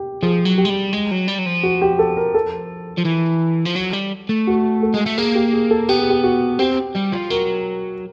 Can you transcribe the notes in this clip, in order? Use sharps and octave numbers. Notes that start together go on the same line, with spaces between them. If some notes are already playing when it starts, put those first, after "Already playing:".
Already playing: G4
F3 G#4
F#3
G4
G#3
G3
G#3
F#3
G3
F#3
F3
F#4
G4
A4
A#4
A4
F3
E3
F3
F#3
G3
A3
F#4
A4
G#3
A3
A#3 G#4
G4
G#4
A4
B3 G4
G#4
G4
F#4
C4 G4
G3
F3
F#3 A#4